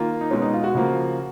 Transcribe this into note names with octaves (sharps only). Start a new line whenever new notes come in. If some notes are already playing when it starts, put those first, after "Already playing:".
Already playing: D#3 A#3 F4
D#4
B2 G#3 C#4
D#4
F4
F#4
C#3 F3 A#3